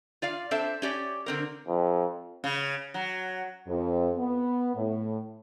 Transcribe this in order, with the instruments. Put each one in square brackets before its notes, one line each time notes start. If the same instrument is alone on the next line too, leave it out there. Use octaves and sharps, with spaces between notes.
[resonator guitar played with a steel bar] F4 D5 F5
C4 D4 A4 C5 E5 A5
C#4 G4 D5
D3 C4 A#4
[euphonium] F2
[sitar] C#3
F#3
[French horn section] F2
B3
A2